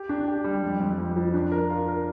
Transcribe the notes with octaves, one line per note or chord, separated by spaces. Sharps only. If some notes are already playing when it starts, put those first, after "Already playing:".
Already playing: G4
D4
G4
G3
F2
F2
F2
F3
D4
A#4
F4
A#4